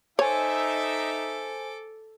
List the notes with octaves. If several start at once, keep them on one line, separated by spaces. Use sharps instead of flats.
D#4 A4 C5 C#5 E5 G#5 D6